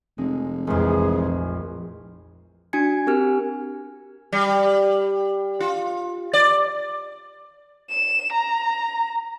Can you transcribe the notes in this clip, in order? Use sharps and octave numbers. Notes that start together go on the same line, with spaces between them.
F1 G#3
A#1 F2 E3 G#3 G#4
D4 F#4 G#5 G#6 C#7
C4 G4 A#4 G#5 F6
G3
F4
D5
E7
A#5